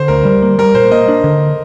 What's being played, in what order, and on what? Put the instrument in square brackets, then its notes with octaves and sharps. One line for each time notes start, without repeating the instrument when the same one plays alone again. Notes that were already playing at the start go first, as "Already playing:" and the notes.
Already playing: [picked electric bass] D3 [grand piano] C5
[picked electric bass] D2 [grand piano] A#4
[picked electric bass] G3
A#3
[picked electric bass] G3 [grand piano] A#4
[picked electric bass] A#2 [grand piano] C5
[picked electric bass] A#3 [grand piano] D#5
[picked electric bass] D4
D3